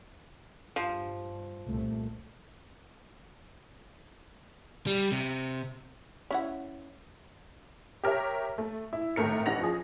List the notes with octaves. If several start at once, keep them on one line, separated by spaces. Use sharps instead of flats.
G2 F3
C2 A#2 A3
G3
C3
C#4 E4 F#5
G4 A#4 C#5 E5
A3
E4
G#1 A2 A3 A#4 C#7
A1 F#5 A#6 F7
F3 G#4